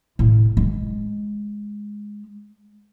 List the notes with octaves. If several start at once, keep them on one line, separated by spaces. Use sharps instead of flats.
A2
G#3